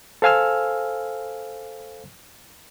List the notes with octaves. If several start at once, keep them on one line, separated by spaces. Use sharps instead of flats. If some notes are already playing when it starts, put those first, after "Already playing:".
A4 C5 F5 G#5 E6 F6